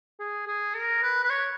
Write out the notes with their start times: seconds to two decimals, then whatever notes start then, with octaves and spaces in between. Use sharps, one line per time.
0.19 G#4
0.47 G#4
0.74 A#4
1.03 B4
1.24 B4
1.30 C#5